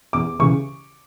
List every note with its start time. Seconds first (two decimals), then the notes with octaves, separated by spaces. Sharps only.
0.13 E2 D6
0.39 C#3 E3 C#6